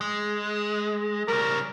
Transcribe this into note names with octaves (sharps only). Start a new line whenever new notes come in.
G#3
C#3 G3 A#4